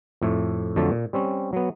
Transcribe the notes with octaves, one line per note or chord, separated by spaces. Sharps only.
F2 A2 A3
F2 D3 F#3 A3 A5
A#2
G3 C4 C#4
F#3 B3